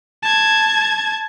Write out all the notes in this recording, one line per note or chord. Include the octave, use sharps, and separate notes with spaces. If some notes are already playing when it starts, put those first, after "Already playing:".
A5 G#6